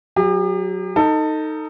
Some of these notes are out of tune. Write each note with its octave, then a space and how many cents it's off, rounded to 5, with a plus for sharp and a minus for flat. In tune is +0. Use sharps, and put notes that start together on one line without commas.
F#3 +0 G4 +45
D#4 +0 A4 +25